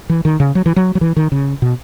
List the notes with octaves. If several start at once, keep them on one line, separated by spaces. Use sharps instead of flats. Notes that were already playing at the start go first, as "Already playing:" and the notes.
E3
D#3
C#3
F#3
E3
F#3
F#3
E3
D#3
C#3
B2